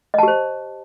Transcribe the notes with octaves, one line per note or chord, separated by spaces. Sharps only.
G4 C5 D#5 A5